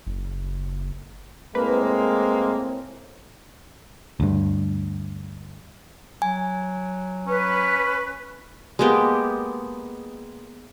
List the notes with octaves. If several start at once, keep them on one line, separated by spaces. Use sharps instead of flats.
F#1
A2 G#3 A#3 C4 B4
D2 G2
F#3 G#5
C#4 B4
G#3 A#3 B3 G4